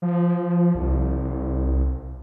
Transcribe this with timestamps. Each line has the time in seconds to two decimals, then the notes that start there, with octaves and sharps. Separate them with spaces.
0.02 F3
0.75 C2